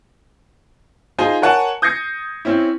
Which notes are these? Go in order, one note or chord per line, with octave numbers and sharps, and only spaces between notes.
D#4 F4 G#4 C5 G#5
A#4 C#5 F#5 G#5 A5
D#6 G6 G#6 A#6 C7 C#7
C4 C#4 E4